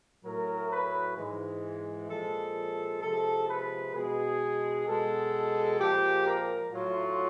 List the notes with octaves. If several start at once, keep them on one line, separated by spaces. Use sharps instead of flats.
A2 F#3 A#4
B4
G#2 E3 G#3
A#2 F3 G#3 A4
C3 F3 G#3 A4
B4
B2 G#3 G#4
B2 G#3 A4
A#2 F3 G#3 G4
A#4
A2 F#3 F4